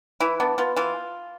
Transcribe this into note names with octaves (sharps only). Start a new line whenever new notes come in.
E3 E4
B3 D4
B3 F4
E3 F4